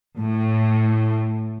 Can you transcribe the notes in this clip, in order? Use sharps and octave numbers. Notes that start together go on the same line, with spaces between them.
A2